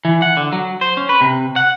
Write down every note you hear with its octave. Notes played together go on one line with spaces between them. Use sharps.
E3
F#5
D3
F#3
C5
C#4
B4
C3
F#5